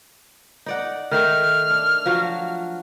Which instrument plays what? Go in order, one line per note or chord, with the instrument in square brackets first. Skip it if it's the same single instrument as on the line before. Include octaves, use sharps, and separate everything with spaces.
[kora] D#4 D5 F#5
[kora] D#3 A3 D#4 [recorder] F6
[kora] D4
F3 F#3 F#4